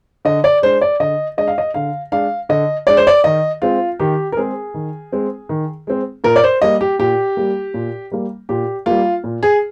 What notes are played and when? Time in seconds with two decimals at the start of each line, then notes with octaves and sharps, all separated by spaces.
0.25 D3 D#5
0.44 D5
0.62 G#3 D4 C5
0.81 D5
1.00 D3 D#5
1.37 G#3 D4 D#5
1.47 F5
1.58 D#5
1.74 D3 F5
2.12 G#3 D4 F5
2.49 D3 D#5
2.87 G#3 D4 D5
2.97 C5
3.07 D5
3.24 D#3 D#5
3.62 G#3 C4 F4
4.00 D#3 G4
4.32 A#4
4.37 G#3 C4 G#4
4.74 D#3
5.12 G#3 C4
5.49 D#3
5.87 G#3 C4
6.24 A#2 A#4
6.36 D5
6.44 C5
6.62 G3 A#3 D#5
6.81 G4
6.99 A#2 G4
7.37 G3 A#3
7.74 A#2
8.12 G3 A#3
8.49 A#2 G4
8.86 G3 A#3 F4
9.24 A#2
9.43 G#4